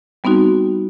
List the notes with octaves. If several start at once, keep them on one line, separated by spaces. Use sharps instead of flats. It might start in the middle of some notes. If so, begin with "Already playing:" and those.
G3 B3 C4 D#4 F#4